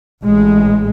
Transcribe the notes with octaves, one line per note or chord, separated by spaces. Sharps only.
A1 G#3